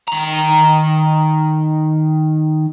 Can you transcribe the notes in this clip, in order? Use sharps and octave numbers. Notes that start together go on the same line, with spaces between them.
D#3 A#5